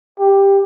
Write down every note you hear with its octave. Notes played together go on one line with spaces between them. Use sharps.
G4